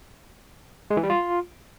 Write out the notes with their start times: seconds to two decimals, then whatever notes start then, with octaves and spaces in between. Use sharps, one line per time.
0.91 G#3
0.97 E3
1.03 G3
1.10 F4